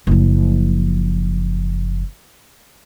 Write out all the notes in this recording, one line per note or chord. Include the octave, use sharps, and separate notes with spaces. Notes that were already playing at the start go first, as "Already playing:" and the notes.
F#1 F3